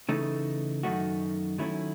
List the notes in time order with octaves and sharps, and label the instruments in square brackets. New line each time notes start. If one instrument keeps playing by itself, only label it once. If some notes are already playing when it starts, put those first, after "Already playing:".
[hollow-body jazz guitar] C#3 E3 A3 D#4
F#2 D#3 A3 D#4 F#4
D#3 F#3 A3 C#4 E4